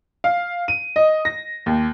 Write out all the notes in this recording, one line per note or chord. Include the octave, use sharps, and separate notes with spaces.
F5
D#7
D#5
A#6
D#2